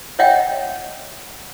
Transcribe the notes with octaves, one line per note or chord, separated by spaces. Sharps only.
C#5 D#5 E5 F#5 G5